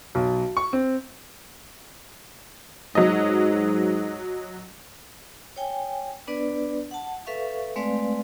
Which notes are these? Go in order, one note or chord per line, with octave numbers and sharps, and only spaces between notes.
B1
C#6
C4
G#2 F#3 D#5
C#5 G5 G#5
B3 D4 B4 D5
F#5 A5
A4 B4 E5 F5 C#6
G#3 A3 C4 B4 D5 F5